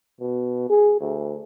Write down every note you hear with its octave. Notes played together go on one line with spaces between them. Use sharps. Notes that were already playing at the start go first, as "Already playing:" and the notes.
B2
G#4
D2